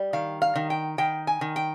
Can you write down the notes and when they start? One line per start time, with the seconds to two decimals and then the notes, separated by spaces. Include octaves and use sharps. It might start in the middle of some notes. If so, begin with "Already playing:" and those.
Already playing: G3
0.13 D#3 F5
0.42 F5
0.55 D#3
0.70 G5
0.98 D#3 G5
1.27 G#5
1.41 D#3
1.56 G5